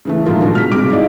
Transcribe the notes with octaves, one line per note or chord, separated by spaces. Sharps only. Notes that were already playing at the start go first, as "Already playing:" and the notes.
C#3 E3 A3
A#2 D#3 F3 F4 A#4
B2 G#3 D4 F#4
F6 B6
G1 C3 G#3 F#4 D6 D7
D#4 E4 G#4 D5 D#5 F5